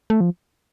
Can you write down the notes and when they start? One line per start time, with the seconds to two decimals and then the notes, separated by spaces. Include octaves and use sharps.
0.10 A3
0.21 F3